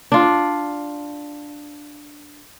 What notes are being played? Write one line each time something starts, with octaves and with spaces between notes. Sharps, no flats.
D4 F4